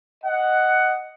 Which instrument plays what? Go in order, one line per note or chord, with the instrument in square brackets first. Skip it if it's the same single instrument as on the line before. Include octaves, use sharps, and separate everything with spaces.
[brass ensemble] D#5 F#5